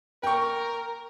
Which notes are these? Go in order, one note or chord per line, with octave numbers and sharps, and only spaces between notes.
A#4 G5 C#6